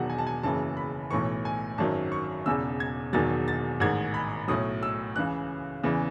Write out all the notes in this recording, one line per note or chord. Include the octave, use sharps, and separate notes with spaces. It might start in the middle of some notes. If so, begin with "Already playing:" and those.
Already playing: E1 E2 D#3 F#3 F#5
G#5
A5
G#5
F#1 F#2 C#3 E3 A5
B5
B1 A2 E3 C#6
G#5
G#1 F#2 D#3 F#3 A5
C#6
E1 E2 C#3 E6
G#6
E1 E2 D#3 F#3 A6
A6
A1 G#2 D#3 G#6
B5
B1 A2 F#3 D#6
E6
C#2 C#3 E3 F#6
E2 C#3 E3